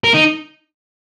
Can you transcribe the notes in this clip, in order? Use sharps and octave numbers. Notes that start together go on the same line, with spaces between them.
A#4
D#4